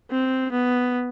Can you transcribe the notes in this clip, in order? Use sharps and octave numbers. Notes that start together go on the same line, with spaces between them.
C4
B3